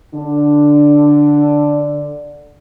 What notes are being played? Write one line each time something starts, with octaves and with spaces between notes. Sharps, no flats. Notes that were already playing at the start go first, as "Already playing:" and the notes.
D3 D4